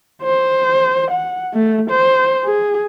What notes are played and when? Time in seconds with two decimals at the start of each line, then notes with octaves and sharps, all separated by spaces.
0.23 C5
1.11 F#5
1.54 A3
1.91 C5
2.45 G#4